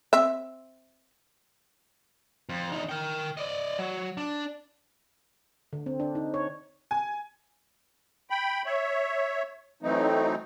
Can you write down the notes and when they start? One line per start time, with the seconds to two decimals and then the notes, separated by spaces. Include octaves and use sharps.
0.13 C4 E5
2.49 F2
2.72 E2 D#4
2.89 A#4 G5
3.37 D5 D#5
3.79 F#3
4.17 D4
5.73 D3
5.86 C4
6.00 D4
6.15 D#4
6.34 C#5
6.91 G#5
8.30 G5 B5
8.66 C#5 E5
9.83 E3 F#3 A3 C4 D#4